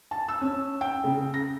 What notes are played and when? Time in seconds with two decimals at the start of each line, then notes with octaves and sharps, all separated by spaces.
0.11 A5
0.29 E6
0.41 C#4
0.81 G5
1.04 C#3
1.34 A#6